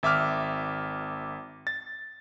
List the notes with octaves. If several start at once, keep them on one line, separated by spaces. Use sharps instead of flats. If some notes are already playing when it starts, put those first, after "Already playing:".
G#1 E5 D6 F6
A6